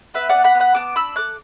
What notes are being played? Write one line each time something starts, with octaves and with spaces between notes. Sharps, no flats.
B3 B4 E5
B3 D5 F#5
F#5 B5
B3
F#5 B5
B3 A5 D6
D4 B5 E6
A4 D6 F#6